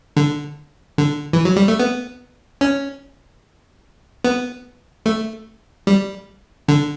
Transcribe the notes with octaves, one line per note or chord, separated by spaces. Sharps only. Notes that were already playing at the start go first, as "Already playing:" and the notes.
D3
D3
E3
F#3
G3
A3
B3
C#4
B3
A3
G3
D3